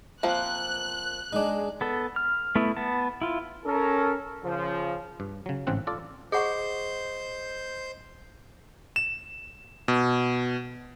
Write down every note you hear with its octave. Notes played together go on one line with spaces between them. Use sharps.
F3 A#3 C4 F#6
G#3 D4 D#4
B3 A4
F6
A3 B3 E4
B3 A5
E4 F4
C#4 A4 A#4
C#3 F3
G2
C#3 F#3
A1 G#2 C#3 C4 F#5
F4 A4 D5
G#4 C5 D#5 F#5 C#6 G6
E7
B2